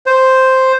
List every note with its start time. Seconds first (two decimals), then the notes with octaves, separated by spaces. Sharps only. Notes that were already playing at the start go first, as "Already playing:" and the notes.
0.06 C5